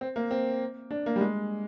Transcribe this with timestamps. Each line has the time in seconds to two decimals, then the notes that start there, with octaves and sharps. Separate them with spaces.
0.01 C4
0.16 A#3
0.31 C4
0.91 D4
1.06 A#3
1.16 G3
1.21 G#3